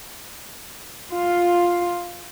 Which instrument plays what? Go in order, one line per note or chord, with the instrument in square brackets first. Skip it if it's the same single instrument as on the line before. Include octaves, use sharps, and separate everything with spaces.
[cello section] F4